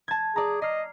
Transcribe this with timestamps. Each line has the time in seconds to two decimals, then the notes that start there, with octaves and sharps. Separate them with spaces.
0.08 A5 G#6
0.36 G#4 D5 A#5
0.62 D#5 F6 C7